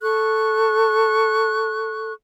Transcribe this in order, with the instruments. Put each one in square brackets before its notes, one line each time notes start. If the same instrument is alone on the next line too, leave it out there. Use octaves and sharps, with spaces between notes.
[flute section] A4 C#6 F#6